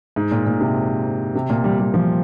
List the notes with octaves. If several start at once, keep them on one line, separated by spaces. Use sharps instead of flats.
G#2
A#2
A#2
C3
C3
A#2
G3
G3
F3